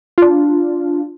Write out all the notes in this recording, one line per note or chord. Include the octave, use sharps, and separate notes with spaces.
D4 F4